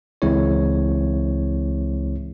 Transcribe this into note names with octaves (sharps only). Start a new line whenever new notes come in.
C#2 E3 G#3 C4 E4 C#5